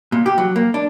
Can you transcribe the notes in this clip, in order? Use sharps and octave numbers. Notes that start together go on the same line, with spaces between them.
A#2
G4
F#3
A#3
D4